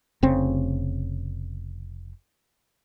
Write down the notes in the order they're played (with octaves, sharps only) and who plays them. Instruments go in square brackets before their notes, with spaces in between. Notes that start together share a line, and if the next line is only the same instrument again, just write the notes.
[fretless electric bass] F1 C#3 C4